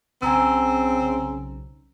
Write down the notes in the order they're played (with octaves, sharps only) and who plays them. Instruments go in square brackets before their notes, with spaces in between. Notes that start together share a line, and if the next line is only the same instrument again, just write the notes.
[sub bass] B1 [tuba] C#3 [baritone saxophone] C4 [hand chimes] G#5 A#5 E6